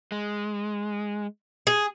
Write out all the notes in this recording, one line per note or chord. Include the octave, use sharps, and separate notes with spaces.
G#3
G#4